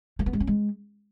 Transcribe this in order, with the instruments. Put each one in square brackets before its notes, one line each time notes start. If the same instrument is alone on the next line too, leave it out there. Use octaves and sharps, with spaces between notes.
[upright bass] A3
B3
G#3
C#4
G#3